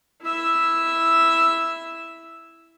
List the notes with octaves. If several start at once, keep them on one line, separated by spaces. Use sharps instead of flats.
E4 E5